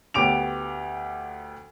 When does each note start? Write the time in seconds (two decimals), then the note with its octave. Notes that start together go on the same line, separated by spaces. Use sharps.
0.14 D2 B3 G4 D6 D7 F7